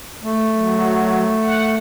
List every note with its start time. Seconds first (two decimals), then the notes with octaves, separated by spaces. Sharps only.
0.23 A3
0.55 F#3
1.43 F#5